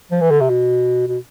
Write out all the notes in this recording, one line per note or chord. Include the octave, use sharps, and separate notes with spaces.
F3
E3
D3
C3
B2
B2